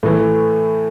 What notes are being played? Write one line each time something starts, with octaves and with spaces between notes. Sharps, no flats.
A2 E3 A3